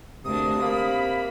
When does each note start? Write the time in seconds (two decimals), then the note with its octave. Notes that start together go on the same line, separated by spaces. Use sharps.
0.25 D2 C3 A#3 D4 D#6
0.62 A#3 B5